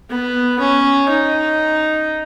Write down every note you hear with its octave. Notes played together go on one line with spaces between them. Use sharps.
B3
C#4
D#4